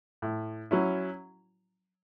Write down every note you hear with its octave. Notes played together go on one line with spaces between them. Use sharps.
A2
F#3 C#4 E4